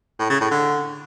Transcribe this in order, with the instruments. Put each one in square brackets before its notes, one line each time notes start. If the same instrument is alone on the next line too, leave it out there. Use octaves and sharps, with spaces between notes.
[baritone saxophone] A2
C#3
A2
D3